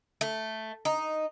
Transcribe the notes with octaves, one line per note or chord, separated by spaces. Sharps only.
A3
D#4